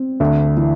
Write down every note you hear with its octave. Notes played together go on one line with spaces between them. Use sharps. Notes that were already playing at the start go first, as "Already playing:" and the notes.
Already playing: C4
D2
E3